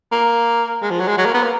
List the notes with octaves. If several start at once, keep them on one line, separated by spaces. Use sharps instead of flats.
A#3
G#3
F3
F#3
G#3
F#3
A#3
B3
A#3